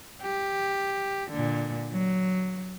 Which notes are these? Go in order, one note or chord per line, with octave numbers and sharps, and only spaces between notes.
G4
A#2 D3
F#3